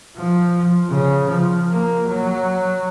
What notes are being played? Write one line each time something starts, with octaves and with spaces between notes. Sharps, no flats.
F3
C#3
F3
A#3
F#3